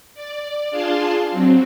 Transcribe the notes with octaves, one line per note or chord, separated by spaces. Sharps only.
D5
D4 F4 G#4 F5 A5 C6
F#3 C4